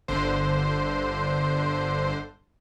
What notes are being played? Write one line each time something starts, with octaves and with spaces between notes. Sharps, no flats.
G1 D3 C5